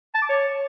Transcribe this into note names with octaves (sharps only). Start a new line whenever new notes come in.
A5
D6
C#5